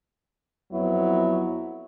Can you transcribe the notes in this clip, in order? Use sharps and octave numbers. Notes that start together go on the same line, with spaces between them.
F2 F#3 B3 E4